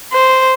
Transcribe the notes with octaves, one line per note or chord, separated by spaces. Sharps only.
C5